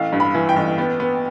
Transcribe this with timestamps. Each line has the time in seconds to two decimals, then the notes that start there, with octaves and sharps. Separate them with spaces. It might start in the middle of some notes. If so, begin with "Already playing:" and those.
Already playing: A1 F5
0.13 G2
0.20 B5
0.34 E3
0.49 G5
0.56 A1
0.78 B3
1.00 B3